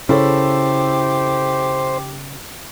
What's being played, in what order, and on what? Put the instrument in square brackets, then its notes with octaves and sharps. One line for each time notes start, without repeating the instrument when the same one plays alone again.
[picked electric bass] C#3 [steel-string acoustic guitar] E4 A4 C#5 [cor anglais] G4 [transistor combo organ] C5